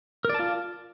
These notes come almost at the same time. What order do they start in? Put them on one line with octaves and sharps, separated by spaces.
A#4 D5 A5 F4